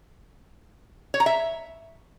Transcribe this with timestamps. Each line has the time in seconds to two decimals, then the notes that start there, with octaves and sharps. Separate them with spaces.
1.14 C#5
1.20 A#5
1.26 E5